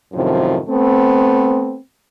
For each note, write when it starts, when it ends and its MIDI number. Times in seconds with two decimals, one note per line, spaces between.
0.13 0.59 42
0.13 0.59 45
0.13 0.59 48
0.13 0.59 51
0.13 0.59 53
0.69 1.77 57
0.69 1.77 59
0.69 1.77 60